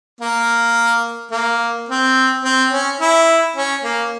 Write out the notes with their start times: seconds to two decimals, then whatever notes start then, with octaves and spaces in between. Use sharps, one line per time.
0.21 A#3
1.32 A#3
1.89 C4
2.45 C4
2.72 C#4
3.00 E4
3.56 C#4
3.83 A#3